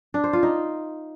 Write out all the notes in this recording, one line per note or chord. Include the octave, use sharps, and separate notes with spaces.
D4
C5
F4
D#4